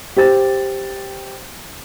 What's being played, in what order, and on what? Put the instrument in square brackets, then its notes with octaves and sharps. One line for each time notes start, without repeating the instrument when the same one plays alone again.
[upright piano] G4 C5 A6